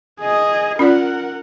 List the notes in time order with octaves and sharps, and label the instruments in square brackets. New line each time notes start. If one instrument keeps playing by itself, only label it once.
[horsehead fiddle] G#4 D#5
[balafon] C#4 F4 D5 [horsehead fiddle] A#4 F#5